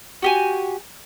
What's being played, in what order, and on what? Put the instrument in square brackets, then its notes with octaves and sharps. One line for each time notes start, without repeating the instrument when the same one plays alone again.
[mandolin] F#4 G4 G#5